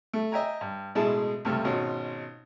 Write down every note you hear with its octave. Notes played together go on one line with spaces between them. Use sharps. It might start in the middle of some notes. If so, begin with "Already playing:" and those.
A3
D#5 E5 G5 G#5 A#5
G2
A1 B2 G#3 E4 G#4 A5
C#2 G2 C3 A3 A4 F6
G#1 B2 C#4 F4 F#4